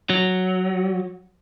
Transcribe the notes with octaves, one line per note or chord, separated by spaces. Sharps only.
F#3